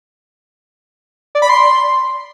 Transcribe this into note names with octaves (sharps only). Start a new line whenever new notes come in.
D5
B5
C6